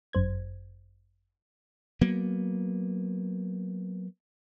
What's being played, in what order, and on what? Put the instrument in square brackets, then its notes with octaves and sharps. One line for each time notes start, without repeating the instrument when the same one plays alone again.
[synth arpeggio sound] G1 F#2 C5 G#6
[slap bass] F#3 A#3 B3